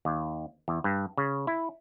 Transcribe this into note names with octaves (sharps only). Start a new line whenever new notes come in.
D#2
E2
G2
C#3
E4